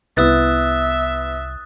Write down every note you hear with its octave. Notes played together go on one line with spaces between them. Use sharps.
C2 B3 E4 E5 D#6 F#6 A6